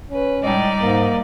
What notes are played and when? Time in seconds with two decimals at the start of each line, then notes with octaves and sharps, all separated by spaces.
0.11 C#4 B4
0.42 A2 G3 G#3 D#4 D5
0.81 G#2 A#3